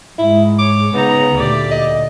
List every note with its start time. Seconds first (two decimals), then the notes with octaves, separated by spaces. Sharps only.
0.18 G#2 G#3 E4
0.59 C#5 D6
0.94 C#3 B3 D#4 A#5
1.36 D2 A#2 G4 D5
1.71 D#5